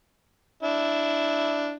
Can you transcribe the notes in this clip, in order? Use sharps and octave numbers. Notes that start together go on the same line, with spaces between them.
D4 E4